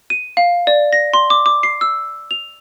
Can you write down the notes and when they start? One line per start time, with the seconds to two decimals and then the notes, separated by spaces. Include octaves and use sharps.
0.10 D#7
0.37 F5
0.67 D5
0.93 A#6
1.13 C6
1.30 D6
1.46 D6
1.63 C7
1.81 E6
2.31 F7